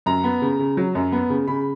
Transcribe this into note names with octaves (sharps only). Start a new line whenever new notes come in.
F#2 A#5
B3
C#3
C#3
F#3
F#2
B3
C#3
C#3 B5